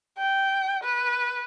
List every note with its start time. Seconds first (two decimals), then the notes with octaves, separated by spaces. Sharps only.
0.18 G5
0.84 B4